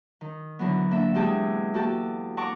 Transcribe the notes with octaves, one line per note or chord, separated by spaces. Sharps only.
D#3
D3 E3 F#3 B3
A#3 D4 E5
E2 G#3 G4 G#4 A5
A#3 F#4 G4 A4 A5
F#5 A5 A#5 C#6 D6